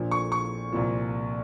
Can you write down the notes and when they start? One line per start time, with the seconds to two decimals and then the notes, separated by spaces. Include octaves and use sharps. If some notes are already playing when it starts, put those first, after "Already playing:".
Already playing: A#1 A#2 F3
0.11 C#6
0.32 C#6
0.72 C2 A#2 F3